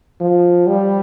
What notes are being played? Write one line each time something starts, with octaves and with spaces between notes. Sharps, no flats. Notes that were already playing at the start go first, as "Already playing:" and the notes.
F3
G3